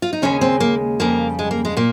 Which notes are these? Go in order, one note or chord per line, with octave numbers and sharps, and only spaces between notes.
F4
D#4
D#2 C#3 G#3 C#4
C4
A#3
F2 C#3 G3 A#3
G#3
A#3
G#3
A#2 A#3